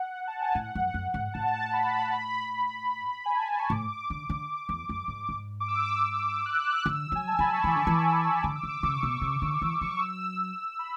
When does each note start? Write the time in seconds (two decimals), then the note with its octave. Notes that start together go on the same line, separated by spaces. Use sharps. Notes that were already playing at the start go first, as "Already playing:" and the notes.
Already playing: F#5
0.27 A5
0.42 G#5
0.55 A2 F#5
0.75 F#2
0.94 F#2
1.14 G#2
1.34 A2 A5
1.73 B5
2.13 B5
3.25 G#5
3.36 A5
3.48 B5
3.59 C#6
3.70 A2 D6
4.10 D3
4.29 D3
4.69 E2
4.89 F#2
5.08 G#2
5.29 G#2
5.60 D6
5.68 E6
6.07 D6
6.46 F#6
6.77 F#6
6.86 D3 E6
7.12 F#3 G#5
7.28 A5
7.39 F#3 B5
7.53 C#6
7.64 E3 D6
7.76 D3
7.87 E3
8.43 D3 D6
8.55 E6
8.63 D3
8.69 D6
8.83 C#3 C#6
9.03 B2
9.22 C#3
9.42 D3
9.62 E3
9.81 F#3 C#6
9.92 D6
10.01 E6
10.79 B5